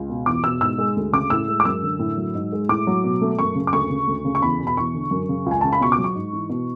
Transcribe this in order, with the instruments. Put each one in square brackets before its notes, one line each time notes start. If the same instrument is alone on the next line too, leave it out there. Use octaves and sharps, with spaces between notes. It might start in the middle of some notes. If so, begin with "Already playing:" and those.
Already playing: [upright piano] C#2
B2
E2 D6
B2 E6
G#2 E6
G#3
D2
C#3 D6
A2 E6
G#3
D6
F#2 E6
D3
A2
F#3
G#2
G#3
A2 D6
F#3
B2
A3
F#2 C#6
C#3
D6
D2 C#6
C#3
D2
C#3
C#6
E2 B5
B2
B5
E2 C#6
D3
F#2
C#3
C#2
G#5
C#3 A5
B5
B2 C#6
D6
F#3
C#6
G#2
E3
B2